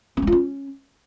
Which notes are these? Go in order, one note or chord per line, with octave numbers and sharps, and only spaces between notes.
C#4
G#3
F4
C#4